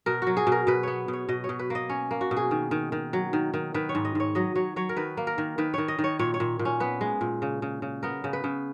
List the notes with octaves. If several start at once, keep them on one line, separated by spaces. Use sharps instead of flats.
B2 A#4
F#3 F#4
G#4
B2
A#4
B2 B4
B3 C#5
B2
C#5
B2 D#5
C#5
B2
B4
A#3 D#5
C#4 C#5
A#3
F#4
B2
G#4
D#3
D#3
D#3
F#3
D#3
D#3
D#3 B4
C#5
G#2
D#5
G#2 C#5
F#3 D#5
F#3 C#5
F#3 C#5
A#4
D#3 B4
A#3
A#4
D#3
D#3 B4
D#3 C#5
D#5
D#3
C#5
A#2 C#5
C#5
A#2
A#2
C#4
B3 B4
G#3
A#2
C#3
C#3
C#3
B3 A#4
C#3
B4
C#3